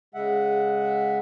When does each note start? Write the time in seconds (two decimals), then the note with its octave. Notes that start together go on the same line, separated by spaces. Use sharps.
0.15 C#3 G#3 E5 F#5